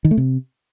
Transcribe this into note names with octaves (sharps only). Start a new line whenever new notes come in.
D#3
A3
C3